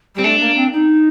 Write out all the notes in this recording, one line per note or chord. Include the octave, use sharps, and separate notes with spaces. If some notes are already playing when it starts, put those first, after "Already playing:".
G3
C4
A3 D4
A#3
C4
D#4